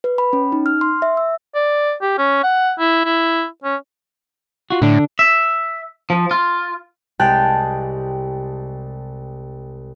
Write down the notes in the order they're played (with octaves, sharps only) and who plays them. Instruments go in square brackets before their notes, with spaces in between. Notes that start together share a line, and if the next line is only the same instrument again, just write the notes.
[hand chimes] B4
B5
C#4
D#4
F6
C6
E5
E6
[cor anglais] D5
G4
C#4
F#5
E4
E4
C#4
[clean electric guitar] F4 F#4
[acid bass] A2 [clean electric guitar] D3 D4
[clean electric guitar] E5
F3
F4
[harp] C2 G#3 G4 G5 A5 F#6